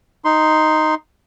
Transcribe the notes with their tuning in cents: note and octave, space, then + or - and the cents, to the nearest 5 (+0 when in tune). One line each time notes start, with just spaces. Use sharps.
D#4 +0 C6 +0